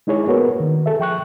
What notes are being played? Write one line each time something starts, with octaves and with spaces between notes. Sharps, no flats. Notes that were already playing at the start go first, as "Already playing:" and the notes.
G#3 D#4 E4 G#4 C#5
A#3 B3 F#4 A#4 B4
D#3
G#4 A4 E5
F3 G5 C#6 F#6